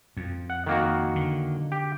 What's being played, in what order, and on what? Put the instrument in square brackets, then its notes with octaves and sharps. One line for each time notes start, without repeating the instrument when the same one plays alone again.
[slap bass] F2
[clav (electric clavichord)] F#5
D#3 A#3 F#4
[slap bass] D3
[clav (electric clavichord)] G4